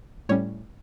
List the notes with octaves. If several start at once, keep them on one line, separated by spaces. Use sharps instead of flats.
A2 G3 C#4 C#5